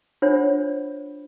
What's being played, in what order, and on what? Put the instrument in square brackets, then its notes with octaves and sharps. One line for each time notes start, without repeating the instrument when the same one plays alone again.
[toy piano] D4 F4 C5 C#5 F#5